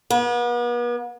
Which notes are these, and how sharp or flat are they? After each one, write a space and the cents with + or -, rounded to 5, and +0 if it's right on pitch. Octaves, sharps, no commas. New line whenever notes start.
B3 -40